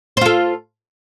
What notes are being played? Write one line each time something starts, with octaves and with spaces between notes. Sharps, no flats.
F4 A4 C5